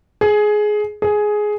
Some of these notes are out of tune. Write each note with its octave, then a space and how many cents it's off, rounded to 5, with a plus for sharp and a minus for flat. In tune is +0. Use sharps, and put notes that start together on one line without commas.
G#4 +15
G#4 +10